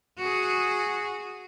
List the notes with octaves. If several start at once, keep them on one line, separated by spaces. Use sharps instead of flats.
F#4 G#4